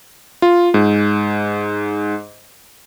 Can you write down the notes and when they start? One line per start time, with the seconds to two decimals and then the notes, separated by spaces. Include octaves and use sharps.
0.42 F4
0.74 G#2